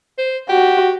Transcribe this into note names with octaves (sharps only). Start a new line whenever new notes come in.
C5
F#4 G4